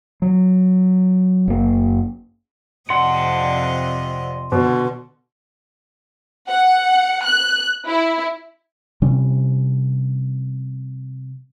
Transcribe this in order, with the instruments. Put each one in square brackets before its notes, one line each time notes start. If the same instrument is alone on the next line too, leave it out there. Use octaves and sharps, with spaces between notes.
[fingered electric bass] F#3
F#1 A#3
[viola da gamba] F2 C3 D#5 [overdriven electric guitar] D5 F#5 [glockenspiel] C6
[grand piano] B2 [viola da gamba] D3
[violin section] F#5
F#6
E4
[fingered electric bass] C3 G3 C#4